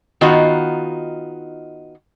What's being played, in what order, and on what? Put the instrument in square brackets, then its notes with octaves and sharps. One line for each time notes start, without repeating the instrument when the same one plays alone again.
[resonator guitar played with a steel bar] D#3 B3 D#4 F4 F#4